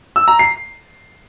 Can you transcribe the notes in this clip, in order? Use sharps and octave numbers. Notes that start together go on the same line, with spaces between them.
E6
A#5
C7